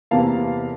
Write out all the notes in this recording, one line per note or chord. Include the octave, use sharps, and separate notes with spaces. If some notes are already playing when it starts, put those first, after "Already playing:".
E2 C3 E3 A#3 F5 A5